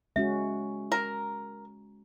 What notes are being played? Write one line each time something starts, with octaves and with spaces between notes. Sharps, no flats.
G#3 C#4 F#4 E5
A#4 A#5